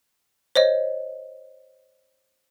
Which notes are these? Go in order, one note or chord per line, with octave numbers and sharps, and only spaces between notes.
C5 C#5 D#5